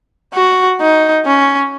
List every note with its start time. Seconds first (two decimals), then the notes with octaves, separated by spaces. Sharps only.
0.34 F#4
0.81 D#4
1.26 C#4